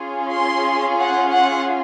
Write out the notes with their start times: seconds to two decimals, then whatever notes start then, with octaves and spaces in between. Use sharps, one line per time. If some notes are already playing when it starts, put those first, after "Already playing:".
Already playing: C#4 F4 G#4
0.31 C6
0.99 F#5
1.32 F#5